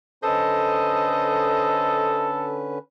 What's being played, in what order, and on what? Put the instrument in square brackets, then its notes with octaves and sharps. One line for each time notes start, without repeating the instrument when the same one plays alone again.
[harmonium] D3 C#4 B4 [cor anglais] A4 [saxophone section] C5 D#5